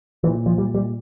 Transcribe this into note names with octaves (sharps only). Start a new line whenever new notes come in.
A#2 E3
F3
G3
G3